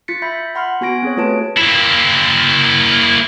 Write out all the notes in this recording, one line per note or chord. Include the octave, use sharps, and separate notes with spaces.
F4 A6 B6 C#7
E5 B5 G6 A#6
F#5 B5 C6 F6
B3 F#4 G#5 A#6 D7
C4 G#4 C#5
A3 F4 B4 C#5 A5 D7
A#3 E4